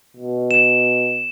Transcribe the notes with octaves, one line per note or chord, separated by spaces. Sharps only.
B2
E7